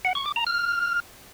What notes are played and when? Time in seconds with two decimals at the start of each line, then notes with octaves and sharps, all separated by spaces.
0.05 F#5
0.15 C#6
0.26 D6
0.36 A#5
0.47 F6